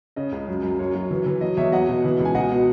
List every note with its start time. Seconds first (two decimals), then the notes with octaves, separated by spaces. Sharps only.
0.16 C#3 D#5
0.32 C#2
0.48 F#2
0.63 F#2
0.79 F#2 C#5
0.95 F#3
1.11 E3
1.26 E3
1.41 F#3 D#5
1.57 E2 C#5 E5
1.72 F#3 D#5 F#5
1.89 B2
2.04 E3
2.20 C#2 G#5
2.35 B2 D#5 F#5
2.51 B2